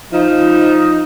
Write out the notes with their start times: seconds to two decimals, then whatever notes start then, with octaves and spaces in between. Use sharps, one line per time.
0.13 F3 D#4